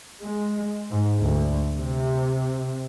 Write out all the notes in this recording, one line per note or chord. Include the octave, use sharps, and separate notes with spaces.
G#3
G#2
D2
C3